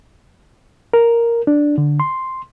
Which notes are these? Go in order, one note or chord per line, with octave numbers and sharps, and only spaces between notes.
A#4
D4
D3
C6